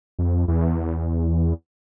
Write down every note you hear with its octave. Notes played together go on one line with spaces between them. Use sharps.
F2
E2